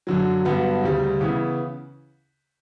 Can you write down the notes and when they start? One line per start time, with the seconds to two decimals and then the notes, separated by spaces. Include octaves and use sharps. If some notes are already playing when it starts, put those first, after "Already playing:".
0.07 F#2 D3 F#3
0.45 G2 D3 F#3 B3
0.82 D2 C#3 G3
1.21 C#3 E3 B3